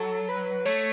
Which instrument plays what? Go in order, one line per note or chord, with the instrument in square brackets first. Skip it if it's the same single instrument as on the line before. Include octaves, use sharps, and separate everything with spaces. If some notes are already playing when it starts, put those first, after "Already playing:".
Already playing: [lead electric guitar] F#3 [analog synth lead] A4
[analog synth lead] B4
[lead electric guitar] A3 [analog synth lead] C#5